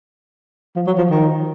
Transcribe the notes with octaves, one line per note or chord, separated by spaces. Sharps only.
F3
F#3
F3
D#3